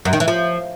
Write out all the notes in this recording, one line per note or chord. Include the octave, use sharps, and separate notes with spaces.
F#2
D#3
E3
F3